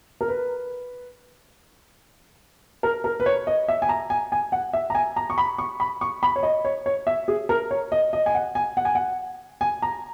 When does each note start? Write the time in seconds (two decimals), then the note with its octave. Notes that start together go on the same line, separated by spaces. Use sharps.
0.21 A#4
0.28 B4
2.83 A#4
3.04 A#4
3.20 B4
3.26 C#5
3.47 D#5
3.68 E5
3.82 G#5
3.89 A#5
4.10 G#5
4.32 G#5
4.52 F#5
4.73 E5
4.90 A#5
4.95 G#5
5.16 A#5
5.30 C#6
5.38 B5
5.59 C#6
5.80 B5
6.01 C#6
6.23 B5
6.36 C#5
6.43 D#5
6.65 C#5
6.86 C#5
7.07 E5
7.28 G#4
7.49 A#4
7.71 C#5
7.92 D#5
8.13 D#5
8.26 G#5
8.34 F#5
8.55 G#5
8.77 F#5
8.85 G#5
8.95 F#5
9.61 G#5
9.82 A#5